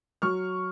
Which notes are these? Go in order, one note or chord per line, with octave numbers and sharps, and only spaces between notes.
F#3 C#6 F6